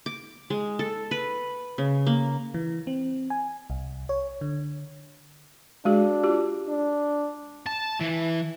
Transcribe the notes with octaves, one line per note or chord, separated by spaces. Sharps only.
D6
G#3
A4
B4
C#3
A#3
E3
C4
G#5
C2
C#5
D3
G#3 D4 F#4 G#4
F4 G4
D4
A5
E3